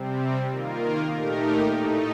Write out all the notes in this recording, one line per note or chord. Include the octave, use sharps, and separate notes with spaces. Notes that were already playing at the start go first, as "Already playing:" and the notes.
Already playing: C3 G3 C4
D#3 A#3 F4 A#4
A#2 A3 D#4 G4 A#4
A2 A3 D#4